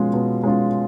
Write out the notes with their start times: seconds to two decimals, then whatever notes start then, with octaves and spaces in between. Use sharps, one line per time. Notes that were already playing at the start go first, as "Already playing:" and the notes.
Already playing: B2 G#3 C#4 F4
0.13 B2
0.43 G#3 C#4 F4